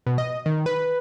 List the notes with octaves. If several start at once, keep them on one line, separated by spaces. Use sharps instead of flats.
B2
D#5
D#3
B4